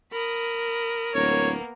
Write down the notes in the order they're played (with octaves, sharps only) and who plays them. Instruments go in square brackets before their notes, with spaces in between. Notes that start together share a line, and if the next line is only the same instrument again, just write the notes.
[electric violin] A#4 [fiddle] B5 D#6
[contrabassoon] D1 [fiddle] A#3 B3 [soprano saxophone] C#5